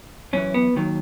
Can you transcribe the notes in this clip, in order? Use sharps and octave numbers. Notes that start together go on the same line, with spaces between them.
F#2 E3 C#4
B3
D#2 D#3 F#3